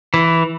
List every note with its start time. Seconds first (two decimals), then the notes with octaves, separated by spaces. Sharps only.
0.14 E3